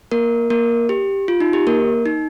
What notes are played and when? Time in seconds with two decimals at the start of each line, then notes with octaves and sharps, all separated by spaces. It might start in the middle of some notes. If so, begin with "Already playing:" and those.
0.12 A#3 A#4
0.50 A#3 A#4
0.89 G4
1.28 F4
1.40 D#4
1.53 G4
1.67 A#3 A#4
2.06 D#4